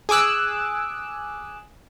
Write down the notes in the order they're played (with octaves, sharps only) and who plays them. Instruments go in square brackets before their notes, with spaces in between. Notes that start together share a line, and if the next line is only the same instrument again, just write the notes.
[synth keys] G#4 G#5 D6 E6 F#6